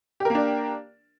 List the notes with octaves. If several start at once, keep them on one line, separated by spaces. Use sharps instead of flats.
A#3 D4 G4 A#4